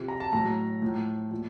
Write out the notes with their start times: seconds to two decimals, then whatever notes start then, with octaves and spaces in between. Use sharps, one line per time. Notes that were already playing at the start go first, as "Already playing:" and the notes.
Already playing: C3 F3
0.08 A#5
0.20 A5
0.33 A2 F#3 A#5
0.82 A2 F3
1.31 A#2 F3